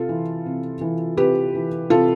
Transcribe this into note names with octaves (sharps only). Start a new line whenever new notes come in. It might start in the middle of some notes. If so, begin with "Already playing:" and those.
Already playing: C3 F4 A4
E3
C3
E3
C3 G4 B4
E3
C3 F4 A4